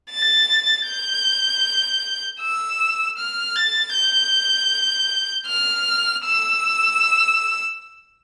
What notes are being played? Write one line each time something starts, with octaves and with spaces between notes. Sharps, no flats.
A6
G6
E6
F6
A6
G6
F6
E6